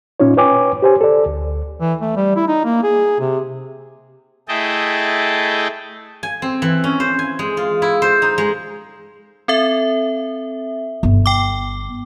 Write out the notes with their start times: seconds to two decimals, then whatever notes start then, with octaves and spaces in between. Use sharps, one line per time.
0.20 A#2 C#4 D#4 F4 C#5
0.37 B4 C#5 G5 G#5 D6
0.82 G4 C5 G#5
1.01 A4 D5
1.26 D2
1.80 E3
2.01 A3
2.16 G3
2.36 E4
2.48 D#4
2.65 A#3
2.83 G#4
3.20 C3
4.48 A3 E4 G#4 D#5 G5 A5
6.23 G#5
6.42 C4
6.62 E3
6.84 C#4
7.00 C5
7.19 G#5
7.39 G#3
7.57 F4
7.82 E4
8.02 C5
8.22 D#4
8.38 G#3
9.48 C4 A4 E5
11.03 G1
11.26 G5 D6